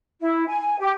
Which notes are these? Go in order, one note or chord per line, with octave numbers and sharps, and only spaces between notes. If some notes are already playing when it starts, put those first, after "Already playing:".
E4
G#5
G4